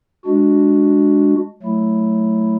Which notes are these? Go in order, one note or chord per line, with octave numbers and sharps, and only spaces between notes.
G#3 D4 F#4
F#3 A3 E4